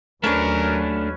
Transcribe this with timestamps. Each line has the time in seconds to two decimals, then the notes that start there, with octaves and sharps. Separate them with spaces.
0.24 D#2 F#3 A3 C#4 D4 A#4 B4 C#5